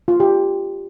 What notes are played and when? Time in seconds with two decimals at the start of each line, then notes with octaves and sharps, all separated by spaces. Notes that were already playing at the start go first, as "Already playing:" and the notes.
0.08 F4
0.20 G4